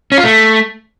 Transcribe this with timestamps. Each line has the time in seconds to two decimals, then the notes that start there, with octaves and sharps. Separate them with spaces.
0.12 C#4
0.18 F4
0.24 A3